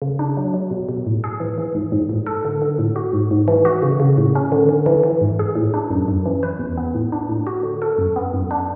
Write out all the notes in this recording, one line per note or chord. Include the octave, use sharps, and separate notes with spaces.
C#3
D4
F#3
F#3
B2
B2
A2
G#4
E3
E3
G#2
G#2
A2
A4
D3
D3
A2
F#4
G#2
G#2
E3
F#4
C#3
C#3
A2
C#4
D3
D3
E3
E3
G#2
G#4
A2
D4
F#2
F#2
E3
B4
E2
B3
A2
D4
A2
F#4
D3
A4
F#2
B3
F#2
D4